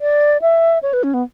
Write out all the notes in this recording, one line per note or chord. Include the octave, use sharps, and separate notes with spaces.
D5
E5
C#5
B4
C#4
B3